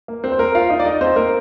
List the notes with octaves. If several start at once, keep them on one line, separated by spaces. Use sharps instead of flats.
A#3
C4
C5
A#3 A#4
F4 F5
D#4 D#5
D5
D#4 D#5
C4 C5
A#3 A#4